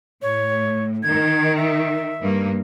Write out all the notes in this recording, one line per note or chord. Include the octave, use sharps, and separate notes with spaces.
A2 C#5
D#3 G#6
E5
G2 A#3